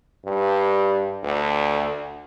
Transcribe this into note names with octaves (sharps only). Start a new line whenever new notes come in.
G2
D2